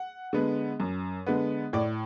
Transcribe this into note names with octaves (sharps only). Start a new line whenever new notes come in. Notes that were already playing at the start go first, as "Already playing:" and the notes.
Already playing: F#5
D3 G#3 B3
F#2
D3 G#3 B3
A2 D5